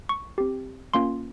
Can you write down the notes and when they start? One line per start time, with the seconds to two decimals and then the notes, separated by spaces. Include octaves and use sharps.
0.09 C#6
0.38 C4 G4
0.94 A#3 C#4 F4 C6